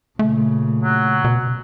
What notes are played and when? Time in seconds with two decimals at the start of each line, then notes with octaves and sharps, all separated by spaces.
0.19 A#2 C#3 A3
0.83 F#3
1.24 B2